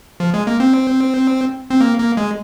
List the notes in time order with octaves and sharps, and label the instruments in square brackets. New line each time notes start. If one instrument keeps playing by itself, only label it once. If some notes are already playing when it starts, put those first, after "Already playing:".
[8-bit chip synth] F3
G#3
A#3
C4
C4
A#3
A#3
G#3